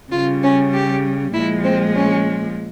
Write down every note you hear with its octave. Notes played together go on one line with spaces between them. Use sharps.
C#3 G3 F4
C#4
G4
A#2 F3 G#3 E4
C4
C#4